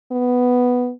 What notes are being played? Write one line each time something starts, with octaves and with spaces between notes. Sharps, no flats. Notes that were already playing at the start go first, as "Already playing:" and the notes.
B3